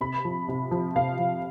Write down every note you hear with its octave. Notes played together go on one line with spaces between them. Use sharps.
C3 B5
F3
C3
F3
C3 F5
F3